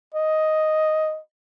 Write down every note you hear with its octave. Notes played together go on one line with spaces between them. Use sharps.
D#5